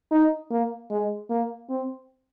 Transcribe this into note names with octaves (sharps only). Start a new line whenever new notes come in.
D#4
A#3
G#3
A#3
C4